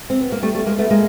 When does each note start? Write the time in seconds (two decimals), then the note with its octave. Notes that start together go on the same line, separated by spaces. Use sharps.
0.10 C4
0.21 B3
0.32 A#3
0.43 G3 A3
0.54 G3 A3
0.66 G#3 A#3
0.79 A3 B3
0.90 G#3 A#3